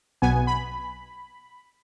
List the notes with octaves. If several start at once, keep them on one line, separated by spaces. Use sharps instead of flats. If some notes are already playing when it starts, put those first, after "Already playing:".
B1 B2 B3 G#5
B5